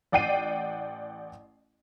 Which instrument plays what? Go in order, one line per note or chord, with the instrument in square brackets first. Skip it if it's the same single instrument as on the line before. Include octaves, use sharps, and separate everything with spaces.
[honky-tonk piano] A1 D5 F#5 G5 C7 D#7